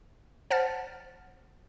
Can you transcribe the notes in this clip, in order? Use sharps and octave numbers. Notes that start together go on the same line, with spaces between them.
C5 F#5 A5 F6 A6